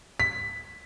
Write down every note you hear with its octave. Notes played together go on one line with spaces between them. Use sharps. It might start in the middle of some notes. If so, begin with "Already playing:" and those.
B6